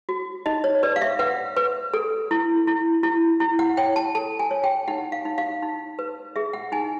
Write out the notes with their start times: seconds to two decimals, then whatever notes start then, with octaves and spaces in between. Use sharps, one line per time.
0.09 F#4
0.46 D#4 D#5
0.64 C#5
0.83 B4 D5
0.96 F5
1.02 E5
1.19 B4 F#5
1.56 B4
1.94 A4
2.31 E4
2.67 E4
3.03 E4
3.40 E4
3.59 F#5
3.77 C#5 G5
3.96 A5
4.15 A4 A5
4.40 G#5
4.51 C#5
4.64 G5
4.88 D#4 F#5
5.12 F5
5.25 D#4
5.38 F5
5.63 D#4
5.99 B4
6.36 G#4 E5
6.53 F#5
6.72 D#4 G#5